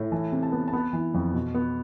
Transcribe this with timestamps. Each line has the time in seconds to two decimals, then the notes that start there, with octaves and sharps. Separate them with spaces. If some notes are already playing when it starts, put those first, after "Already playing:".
Already playing: A2
0.12 E3 A5
0.32 C3
0.43 A5
0.52 B3
0.68 A5
0.72 B3 B5
0.93 E3
1.14 F2
1.34 B2
1.55 B3